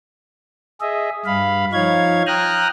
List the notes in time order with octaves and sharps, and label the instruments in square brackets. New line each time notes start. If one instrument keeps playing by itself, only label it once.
[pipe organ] G#4 D#5 E5
G2 F5 B5
F3 D#4 C#5 F5 G#6
G5 A#5 D#6 F6 F#6